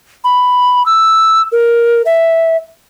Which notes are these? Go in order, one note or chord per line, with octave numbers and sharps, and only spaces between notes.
B5
E6
A#4
E5